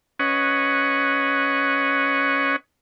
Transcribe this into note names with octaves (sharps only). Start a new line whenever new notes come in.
C#4 B4 C#5 D#5 F#5